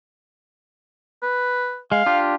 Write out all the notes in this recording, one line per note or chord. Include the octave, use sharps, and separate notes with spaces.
B4
G#3 F5
D4 F4 G4